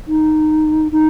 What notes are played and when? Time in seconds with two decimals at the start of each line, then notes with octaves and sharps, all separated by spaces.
0.08 D#4
0.92 D#4